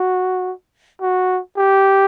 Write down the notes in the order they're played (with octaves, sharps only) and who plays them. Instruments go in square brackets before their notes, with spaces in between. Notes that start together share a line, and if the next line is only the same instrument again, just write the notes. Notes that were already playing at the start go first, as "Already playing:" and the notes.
Already playing: [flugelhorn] F#4
F#4
G4